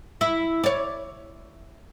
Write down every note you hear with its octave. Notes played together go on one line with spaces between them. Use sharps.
E4
C#5 D5